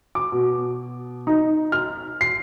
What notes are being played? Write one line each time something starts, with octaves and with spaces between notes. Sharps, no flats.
D6
B2
D#4
F6
C7